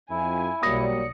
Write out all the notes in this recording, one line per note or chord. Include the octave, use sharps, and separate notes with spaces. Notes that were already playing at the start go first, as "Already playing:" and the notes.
F2 E4 G#5
B1 F#3 G3 A#3 D5 D#6 A#6 C#7